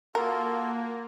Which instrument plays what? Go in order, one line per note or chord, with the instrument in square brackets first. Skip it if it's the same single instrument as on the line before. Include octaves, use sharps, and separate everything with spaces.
[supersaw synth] A#3 [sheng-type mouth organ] F4 F#4 A4 [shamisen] A#4